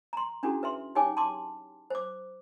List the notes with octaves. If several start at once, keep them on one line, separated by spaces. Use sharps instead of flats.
A#5 C6
C#4 D4 E4 F#4 G#4 A4
B4 E5 C6
D#4 G4 C#5 G5 G#5 D6
A5 C6 D6
C5 D6